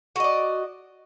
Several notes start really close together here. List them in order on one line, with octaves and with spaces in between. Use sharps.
F#4 D#5 D5